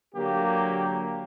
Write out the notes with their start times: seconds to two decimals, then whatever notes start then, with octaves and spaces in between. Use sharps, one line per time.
0.15 D3 F#3 A#3 G4